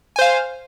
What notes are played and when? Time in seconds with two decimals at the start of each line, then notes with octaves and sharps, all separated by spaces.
0.16 G#5
0.19 C5
0.21 F5